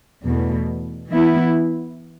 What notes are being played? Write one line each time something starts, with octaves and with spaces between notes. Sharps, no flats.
E2 B2 A3
E3 B3 E4